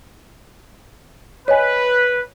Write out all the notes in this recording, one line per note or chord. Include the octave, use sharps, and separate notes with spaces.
B4 C#5 D#5 G#5